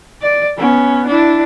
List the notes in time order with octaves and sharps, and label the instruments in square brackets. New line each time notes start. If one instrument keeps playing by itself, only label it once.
[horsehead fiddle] D5
B3 C#4
D4 E4